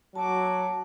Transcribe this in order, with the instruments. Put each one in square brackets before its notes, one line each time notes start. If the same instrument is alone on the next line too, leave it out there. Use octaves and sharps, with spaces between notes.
[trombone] F#3 [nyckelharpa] F#4 D6 [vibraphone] A5